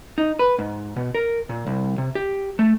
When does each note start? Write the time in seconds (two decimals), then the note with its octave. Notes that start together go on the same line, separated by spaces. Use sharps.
0.18 D#4
0.39 B4
0.58 G#2
0.96 B2
1.15 A#4
1.49 A#2
1.67 C2
1.98 C3
2.15 G4
2.59 A3